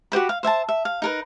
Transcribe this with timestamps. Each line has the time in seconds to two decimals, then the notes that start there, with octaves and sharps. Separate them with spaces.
0.12 F#4 G4 C5 B5
0.29 F5
0.43 C5 E5 G#5 A5
0.69 E5
0.85 F5
1.02 D#4 A#4 B4